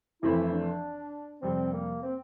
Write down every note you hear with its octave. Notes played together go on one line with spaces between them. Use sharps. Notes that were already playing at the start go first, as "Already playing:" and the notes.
F1 F2 E3 A3 C4 E4
D4
F2 C3 G3 C4
A#3
C4